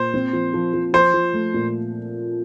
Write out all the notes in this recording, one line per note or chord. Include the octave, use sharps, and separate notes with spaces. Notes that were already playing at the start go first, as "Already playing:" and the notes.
Already playing: A#2 C5
C4
F3
F3
F3
F3 C5
F3
A3
A#2